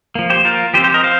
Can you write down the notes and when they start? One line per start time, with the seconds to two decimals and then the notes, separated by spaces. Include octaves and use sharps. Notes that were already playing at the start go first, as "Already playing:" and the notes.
0.15 F3 A#3
0.30 G4 C5
0.45 F4 A#4
0.74 F3 G4 C5
0.78 C4
0.84 G4 C5
0.94 A#4 D#5
1.04 C5 F5